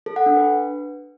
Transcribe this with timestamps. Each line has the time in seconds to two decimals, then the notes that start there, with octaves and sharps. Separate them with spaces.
0.06 A4
0.16 F#5
0.26 D4
0.36 B4